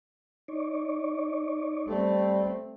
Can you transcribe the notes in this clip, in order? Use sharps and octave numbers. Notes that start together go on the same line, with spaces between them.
D#4 C#5 D5
G3 A3 C4